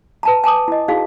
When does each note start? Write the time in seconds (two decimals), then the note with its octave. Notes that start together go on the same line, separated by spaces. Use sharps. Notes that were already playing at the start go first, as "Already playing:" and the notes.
0.23 B4 A5 A#5
0.44 G#5 A5 D6 D#6
0.68 E4 D#5
0.88 D#4 E4 F#4 G#4 F5